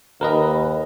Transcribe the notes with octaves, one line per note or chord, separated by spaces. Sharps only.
D#2 A#4 B4 D#5